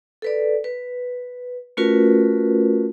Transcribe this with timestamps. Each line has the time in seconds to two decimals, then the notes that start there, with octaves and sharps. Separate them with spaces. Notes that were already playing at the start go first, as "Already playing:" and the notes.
0.22 A4 B4 D5
0.64 B4
1.77 A3 C#4 F4 F#4 A#4 B4